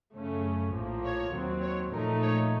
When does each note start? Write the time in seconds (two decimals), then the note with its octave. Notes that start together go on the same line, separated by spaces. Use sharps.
0.14 F#2 C#3 A3 C#4
0.74 A#1 A2 F3 A#3
1.04 C#5
1.33 D#2 D#3 F#3 C4
1.63 C#5
1.93 A#2 F3 A3 D#4 A#4
2.23 C#5